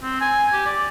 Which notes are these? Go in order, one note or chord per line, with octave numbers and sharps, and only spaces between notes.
C4
G#5
G4
D5